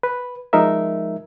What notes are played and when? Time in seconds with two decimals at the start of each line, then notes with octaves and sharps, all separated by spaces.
0.03 B4
0.53 F3 G#3 D#4 A#4 E5